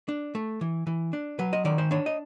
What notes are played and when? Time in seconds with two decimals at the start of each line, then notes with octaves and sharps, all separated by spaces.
0.08 D4
0.35 A3
0.61 E3
0.87 E3
1.13 D4
1.39 F#3 B4
1.53 D#5
1.65 D#3 D5
1.78 C5
1.91 D4 C#5
2.06 D#5